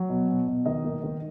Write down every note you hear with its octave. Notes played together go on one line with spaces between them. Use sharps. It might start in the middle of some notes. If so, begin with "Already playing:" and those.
Already playing: F#3
B2
B2
B2
D#3 D#4 D#5
A#3
D#3